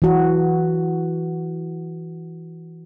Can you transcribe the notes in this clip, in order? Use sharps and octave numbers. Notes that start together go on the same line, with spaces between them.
E3 F#4